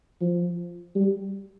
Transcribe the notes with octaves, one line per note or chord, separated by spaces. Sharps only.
F3
G3